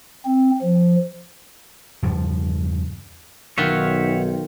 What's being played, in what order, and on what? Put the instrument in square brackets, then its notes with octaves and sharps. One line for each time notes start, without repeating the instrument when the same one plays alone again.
[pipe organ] C4
F3
[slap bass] E2 G2 C#3 F3
[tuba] B1 [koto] D#3 F4 [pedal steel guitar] C#5 E5 F#5